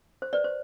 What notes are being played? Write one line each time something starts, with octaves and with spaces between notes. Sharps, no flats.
C5
B4 D5
C5